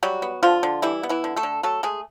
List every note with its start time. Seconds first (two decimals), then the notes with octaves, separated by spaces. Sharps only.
0.03 F#3 G3 F#4
0.22 B3
0.43 D3 F3 F4
0.63 D3
0.82 E3 G3 E4
1.03 B3
1.09 E3 E4
1.24 D3
1.36 A3 A4
1.43 D3
1.63 F#3 A3 A4
1.83 G#3 A3 G#4